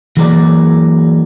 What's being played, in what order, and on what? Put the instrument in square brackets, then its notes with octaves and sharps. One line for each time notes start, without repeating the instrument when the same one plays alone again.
[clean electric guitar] E3 F#3 A#3 G#4 A#4 D5